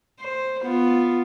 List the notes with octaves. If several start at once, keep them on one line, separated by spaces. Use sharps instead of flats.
C5
B3 F4